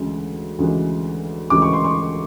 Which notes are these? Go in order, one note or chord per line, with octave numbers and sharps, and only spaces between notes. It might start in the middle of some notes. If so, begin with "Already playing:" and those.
Already playing: D2 C#3 E3 G#3
D2 C#3 E3 G#3
D2 C#3 E3 G#3 D6
C#6
C6
C#6